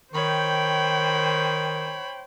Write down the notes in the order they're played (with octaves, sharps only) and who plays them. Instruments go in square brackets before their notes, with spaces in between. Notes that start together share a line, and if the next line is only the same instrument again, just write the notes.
[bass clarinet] D#3 [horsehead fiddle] C5 G5 [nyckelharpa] C#5 B5